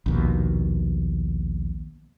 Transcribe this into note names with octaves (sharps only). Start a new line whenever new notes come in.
A#1 D#2 B2